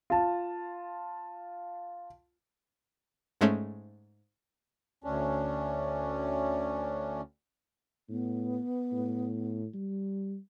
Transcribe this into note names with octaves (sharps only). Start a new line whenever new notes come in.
F4 A5
G#2 G#3 A3 C#4
D2 C#4 D4
A2 B3
A2
G3